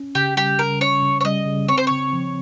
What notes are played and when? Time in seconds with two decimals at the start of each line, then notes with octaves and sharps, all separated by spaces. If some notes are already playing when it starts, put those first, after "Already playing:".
Already playing: C#4
0.15 C#3 G4
0.37 G3 G4
0.58 C#3 A#4
0.81 C#4 C#5
1.03 C#3
1.21 C#5
1.25 G3 D#5
1.46 C#3
1.68 C4 C#5
1.77 C5
1.87 C#3 C#5
2.13 F3